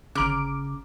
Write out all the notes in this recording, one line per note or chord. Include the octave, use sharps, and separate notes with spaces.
G1 C#3 A#5 D6 F6